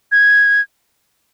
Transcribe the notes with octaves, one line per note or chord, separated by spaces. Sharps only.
G#6